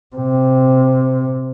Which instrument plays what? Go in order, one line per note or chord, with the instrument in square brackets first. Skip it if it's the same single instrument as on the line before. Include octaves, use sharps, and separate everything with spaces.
[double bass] C3